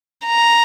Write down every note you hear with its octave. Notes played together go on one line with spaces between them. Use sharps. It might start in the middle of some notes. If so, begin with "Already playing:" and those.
A#5